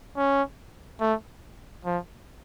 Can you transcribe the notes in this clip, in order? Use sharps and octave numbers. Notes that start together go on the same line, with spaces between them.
C#4
A3
F3